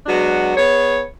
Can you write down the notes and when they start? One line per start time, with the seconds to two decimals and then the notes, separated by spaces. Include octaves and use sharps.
0.06 F#3 G#3 B3 D4 F#4
0.56 B3 G#4 C#5